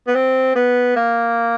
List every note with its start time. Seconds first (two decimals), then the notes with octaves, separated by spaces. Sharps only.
0.07 B3
0.15 C4
0.55 B3
0.96 A#3